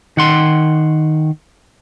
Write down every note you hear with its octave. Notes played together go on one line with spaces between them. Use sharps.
D#3 F#5 C6